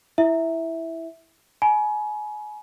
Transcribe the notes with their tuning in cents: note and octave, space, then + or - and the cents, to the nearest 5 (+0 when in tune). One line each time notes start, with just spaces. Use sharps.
E4 +0 E5 -10
G#5 +30 B5 -45